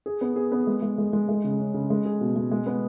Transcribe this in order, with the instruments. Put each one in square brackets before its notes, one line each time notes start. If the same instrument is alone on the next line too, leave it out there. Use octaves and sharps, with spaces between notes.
[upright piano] G#4
B3
G#4
B3
G#3
G#3
G#3
G#3
G#3
C#3
C#4
C#3
G#3
G#4
B2
G#3
G#3
B3